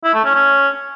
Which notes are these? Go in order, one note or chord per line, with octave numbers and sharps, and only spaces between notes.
E4
A3
C#4
C#4